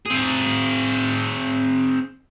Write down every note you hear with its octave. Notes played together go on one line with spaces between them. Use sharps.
C4 G#4